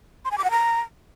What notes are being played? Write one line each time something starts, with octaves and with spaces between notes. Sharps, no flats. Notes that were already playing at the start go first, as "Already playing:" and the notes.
C6
G#5
D6
F#5
A#5